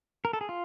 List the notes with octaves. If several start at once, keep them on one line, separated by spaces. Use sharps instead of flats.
A#4
A4
G#4
F4